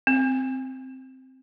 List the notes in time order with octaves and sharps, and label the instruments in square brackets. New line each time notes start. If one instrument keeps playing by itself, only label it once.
[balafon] C4